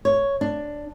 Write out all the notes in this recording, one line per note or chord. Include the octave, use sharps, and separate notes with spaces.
C#5
D4